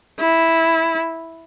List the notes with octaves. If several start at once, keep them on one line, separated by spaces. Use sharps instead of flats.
E4